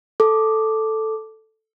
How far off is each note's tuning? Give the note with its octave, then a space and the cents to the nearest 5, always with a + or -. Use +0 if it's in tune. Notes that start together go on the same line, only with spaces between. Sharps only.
A4 +0 D6 +0